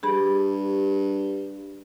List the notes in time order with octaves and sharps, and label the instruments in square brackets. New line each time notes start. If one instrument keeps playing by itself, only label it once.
[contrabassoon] G2 [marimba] G4 G#4 B5